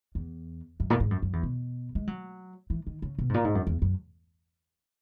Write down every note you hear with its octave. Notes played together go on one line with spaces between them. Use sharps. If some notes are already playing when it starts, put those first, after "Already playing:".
E2
F#2
A#2
G#2
F#2
F#2
E2
B2
G#3
F#3
E3
D#3
C#3
B2
G#2
A#2
G#2
F#2
E2
F#2